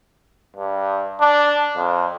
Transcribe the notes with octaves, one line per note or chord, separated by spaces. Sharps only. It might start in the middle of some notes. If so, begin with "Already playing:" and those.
G2
D4
F2